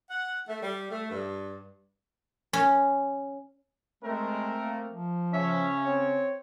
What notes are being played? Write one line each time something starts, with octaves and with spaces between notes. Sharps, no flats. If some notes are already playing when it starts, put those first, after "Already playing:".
F#5
A3
G3
A3
G2
C#4
G#3 A3 C4 A#4
A#3
F3
C#3 C#4 E5
C4 C#5